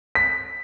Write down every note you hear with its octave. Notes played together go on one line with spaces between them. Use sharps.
B6